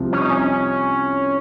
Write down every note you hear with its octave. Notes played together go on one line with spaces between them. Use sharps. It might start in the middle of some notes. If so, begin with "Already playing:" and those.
Already playing: C2 C3 F3
C#4
D#4
C#4